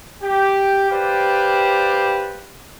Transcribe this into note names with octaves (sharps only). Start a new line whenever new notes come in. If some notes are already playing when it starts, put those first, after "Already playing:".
G4
G4 B4 C5 D5 F5